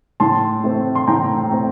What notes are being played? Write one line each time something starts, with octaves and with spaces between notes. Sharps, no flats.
A2 A5 C6
A3 C4
C6
A2 G5 A#5
A3 C4